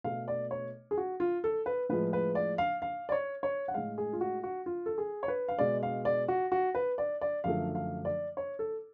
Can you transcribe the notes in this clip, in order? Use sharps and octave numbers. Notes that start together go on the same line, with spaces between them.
B2 A3 F5
D5
C#5
G#4
F#4
F4
A4
B4
A2 F3 G#3 B4
B4
D5
F5
F5
D5
C#5
C#5
F#5
A2 G#3 F5
G#4
F4
F#4
F#4
F4
A4
G#4
C#5
B4
F5
B2 G#3 D5
F5
D5
F#4
F#4
B4
D5
D5
F#2 D3 F3 A3 F5
F5
D5
C#5
A4